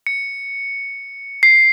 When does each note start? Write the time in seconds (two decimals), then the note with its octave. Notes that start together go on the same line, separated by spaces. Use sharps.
0.07 C#7
1.43 C7